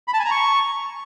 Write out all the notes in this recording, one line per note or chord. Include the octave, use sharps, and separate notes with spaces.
B5
A5
G#5
A#5
C#6